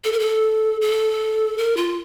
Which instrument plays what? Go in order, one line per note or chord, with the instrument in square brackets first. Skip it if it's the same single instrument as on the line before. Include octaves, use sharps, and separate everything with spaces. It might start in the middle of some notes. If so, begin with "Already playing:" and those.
[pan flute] A4
A#4
A4
A4
A#4
F4